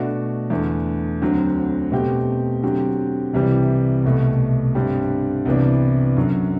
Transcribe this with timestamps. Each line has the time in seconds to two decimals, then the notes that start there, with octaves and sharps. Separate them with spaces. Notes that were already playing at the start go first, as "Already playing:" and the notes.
Already playing: B2 A3 D4 F#4
0.50 E2 D3 A3
1.22 D2 D3 F#3 C4
1.92 B2 A3 C4 G4
2.63 D3 F#3 C4 G4
3.33 C2 C3 E3 G3
4.04 C2 B2 A3
4.75 G2 D3 G3 C4
5.45 C2 C3 E3 B3 D4
6.17 F#2 D3 F#3